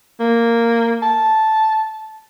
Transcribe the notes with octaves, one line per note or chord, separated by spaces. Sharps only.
A#3
A5